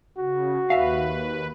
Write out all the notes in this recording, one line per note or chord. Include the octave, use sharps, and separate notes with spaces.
C#3 F#4
D#2 B4 E5 F5